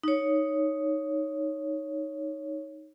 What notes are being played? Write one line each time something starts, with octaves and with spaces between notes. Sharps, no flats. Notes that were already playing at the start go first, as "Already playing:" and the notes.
D#4 C#5